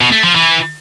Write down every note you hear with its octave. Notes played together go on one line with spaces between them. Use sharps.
B2
A3
F3
E3